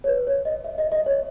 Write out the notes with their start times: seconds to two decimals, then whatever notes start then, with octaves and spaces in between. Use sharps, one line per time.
0.04 C#5
0.08 B4
0.27 C#5
0.45 D#5
0.64 E5
0.78 D#5
0.92 D#5
1.06 C#5